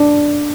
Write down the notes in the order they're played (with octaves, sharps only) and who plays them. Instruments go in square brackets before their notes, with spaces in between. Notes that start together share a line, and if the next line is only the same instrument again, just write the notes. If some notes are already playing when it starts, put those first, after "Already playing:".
Already playing: [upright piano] D4